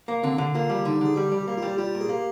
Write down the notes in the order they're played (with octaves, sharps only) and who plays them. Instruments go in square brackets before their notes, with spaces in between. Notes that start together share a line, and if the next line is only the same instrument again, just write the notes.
[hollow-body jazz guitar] A#3
[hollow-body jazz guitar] D3 [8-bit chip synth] C4
[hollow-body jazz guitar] D3
[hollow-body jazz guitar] A#3 [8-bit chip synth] F4
[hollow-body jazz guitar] G3
[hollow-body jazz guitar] D3 [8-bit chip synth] D#4
[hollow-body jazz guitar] D3 [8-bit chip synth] G#4
[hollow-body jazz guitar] G3 [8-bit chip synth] G4
[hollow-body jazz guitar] G3
[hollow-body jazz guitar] A#3 [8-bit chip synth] G4
[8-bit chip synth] F4
[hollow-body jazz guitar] G3
[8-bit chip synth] G4
[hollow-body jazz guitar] G3 [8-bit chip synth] F4
[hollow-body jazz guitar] A#2
[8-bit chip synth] G#4
[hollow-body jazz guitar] A#3 [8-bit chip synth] G4